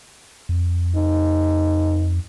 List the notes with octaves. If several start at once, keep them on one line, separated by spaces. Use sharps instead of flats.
F2
D#4